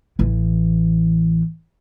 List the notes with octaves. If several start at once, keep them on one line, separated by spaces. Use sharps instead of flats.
A1 E3